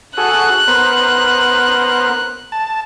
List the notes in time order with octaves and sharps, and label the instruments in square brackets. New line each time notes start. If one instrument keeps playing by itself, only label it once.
[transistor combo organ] F#4 G#4 A4 [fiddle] F#6
[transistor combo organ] B3 A#4 C5
A5